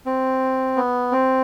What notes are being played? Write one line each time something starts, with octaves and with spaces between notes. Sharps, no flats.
C4
B3
C4